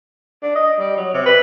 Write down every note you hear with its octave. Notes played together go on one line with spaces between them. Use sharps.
D4
D#5
G3
F#3
C3
B4